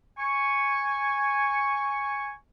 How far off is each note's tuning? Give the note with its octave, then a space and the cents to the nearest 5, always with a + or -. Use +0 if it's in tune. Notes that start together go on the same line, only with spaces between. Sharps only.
G#5 -5 C#6 +0